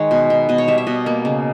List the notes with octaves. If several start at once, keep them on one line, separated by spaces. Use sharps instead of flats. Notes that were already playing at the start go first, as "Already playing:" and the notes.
Already playing: D#3 G#3 B4 C#5
B2
B3
B2 D#5
C#5
G3 E5
E5
B2 D#5
A#3
C#3